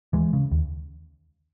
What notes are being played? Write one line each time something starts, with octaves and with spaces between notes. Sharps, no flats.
D#2 E3 G#3
C#3
D#2